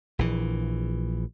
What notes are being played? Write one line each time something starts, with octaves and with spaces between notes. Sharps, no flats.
A#1 E3